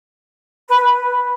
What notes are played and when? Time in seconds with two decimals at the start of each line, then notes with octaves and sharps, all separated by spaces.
0.67 B4